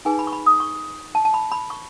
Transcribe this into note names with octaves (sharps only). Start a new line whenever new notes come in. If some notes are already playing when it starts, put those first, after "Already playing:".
D#4 G#4 B4 G#5
B5
C#6
B5
D#6
C#6
A5
A5
B5
B5
C#6